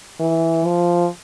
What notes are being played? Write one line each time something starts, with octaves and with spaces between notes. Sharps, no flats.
E3
F3